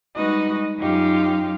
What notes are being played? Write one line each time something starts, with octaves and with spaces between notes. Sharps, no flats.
G3 G#3 D#4 F#4 B4 D#5
F#2 D#4 F4 G4 F5